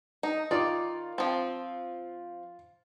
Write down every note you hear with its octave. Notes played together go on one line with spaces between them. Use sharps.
D#4
D#3 F4 D5
F3 C4